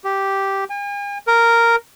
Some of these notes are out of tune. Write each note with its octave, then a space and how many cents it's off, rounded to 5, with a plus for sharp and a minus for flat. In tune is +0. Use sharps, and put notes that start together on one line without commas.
G4 -5
G#5 -45
A#4 -5